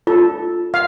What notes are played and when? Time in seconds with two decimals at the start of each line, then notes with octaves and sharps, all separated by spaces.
0.07 F4 A4
0.74 F5